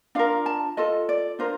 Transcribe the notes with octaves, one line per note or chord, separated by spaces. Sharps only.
D4 F4 A#4 F5
A5
F4 A4 D#5
D5
D4 F4 A#4 C5